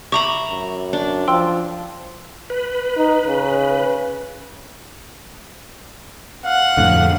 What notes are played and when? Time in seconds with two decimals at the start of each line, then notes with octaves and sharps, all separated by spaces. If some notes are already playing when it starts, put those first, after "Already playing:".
0.12 E5 A#5 B5 C#6 D6
0.50 F#2
0.93 D4
1.28 F3 G5 C6 E6
2.50 B4
2.97 D#4
3.26 C#3
6.45 F5 F#5
6.77 F2 A2 D3